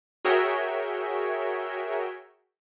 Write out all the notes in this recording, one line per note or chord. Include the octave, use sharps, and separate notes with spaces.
F#4 G#4 A#4 C#5 E5 G5